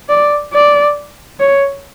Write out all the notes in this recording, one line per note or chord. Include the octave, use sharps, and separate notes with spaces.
D5
D5
C#5